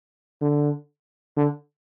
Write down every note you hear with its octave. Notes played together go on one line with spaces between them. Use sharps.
D3
D3